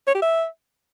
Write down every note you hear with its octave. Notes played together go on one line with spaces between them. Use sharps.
C#5
G4
E5